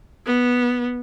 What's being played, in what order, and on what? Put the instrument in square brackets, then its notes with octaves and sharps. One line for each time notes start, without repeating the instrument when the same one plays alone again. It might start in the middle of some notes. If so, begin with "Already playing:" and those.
[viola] B3